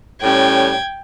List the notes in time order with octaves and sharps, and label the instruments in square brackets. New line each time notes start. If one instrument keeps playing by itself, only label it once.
[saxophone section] A2 G3 C#4 [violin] G5 G#6